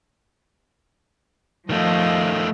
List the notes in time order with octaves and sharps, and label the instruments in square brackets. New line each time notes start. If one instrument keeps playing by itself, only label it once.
[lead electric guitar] D#3 A3 [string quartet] F3 D#5 F5